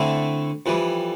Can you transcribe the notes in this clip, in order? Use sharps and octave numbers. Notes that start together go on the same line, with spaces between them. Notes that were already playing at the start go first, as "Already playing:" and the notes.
Already playing: D3 A3 C4 E4
F2 E3 G3